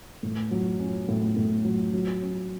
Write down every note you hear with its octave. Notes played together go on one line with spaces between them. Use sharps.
A2
F#3
C#4
A2
A2
F#3
F#3
C#4